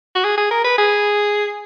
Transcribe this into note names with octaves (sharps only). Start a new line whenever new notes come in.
F#4
G#4
G#4
A#4
B4
G#4